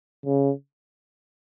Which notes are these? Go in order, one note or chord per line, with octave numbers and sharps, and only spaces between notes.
C#3